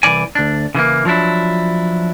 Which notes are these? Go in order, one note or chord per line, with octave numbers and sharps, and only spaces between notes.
C2 E3 D5 G#5
D2 D4
C#3 E3 G#3 A#3
F3 F#3 D4 E4